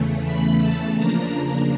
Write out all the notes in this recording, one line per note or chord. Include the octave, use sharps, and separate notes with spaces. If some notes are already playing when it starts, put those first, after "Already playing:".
Already playing: E2 C#3 E3 A3
B5
A5
C#3 F3 A#3 D4 A#5